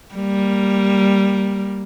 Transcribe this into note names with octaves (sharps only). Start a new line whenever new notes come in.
G3 A#3